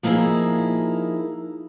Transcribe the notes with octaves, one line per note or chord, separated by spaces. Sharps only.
F3 A#3 D#4 E4 G#4 A#4